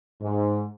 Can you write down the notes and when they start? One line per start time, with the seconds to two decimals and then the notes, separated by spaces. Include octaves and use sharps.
0.21 G#2